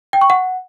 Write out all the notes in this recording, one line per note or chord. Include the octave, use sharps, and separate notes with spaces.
G5
C#6
F#5